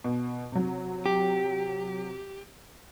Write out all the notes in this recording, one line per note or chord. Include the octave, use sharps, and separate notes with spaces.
B2
C3 F#3
G4